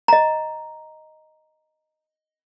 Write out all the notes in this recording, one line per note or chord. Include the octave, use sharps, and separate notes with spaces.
D#5 A#5